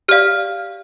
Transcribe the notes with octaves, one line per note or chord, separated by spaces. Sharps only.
G4 D5 F5 F6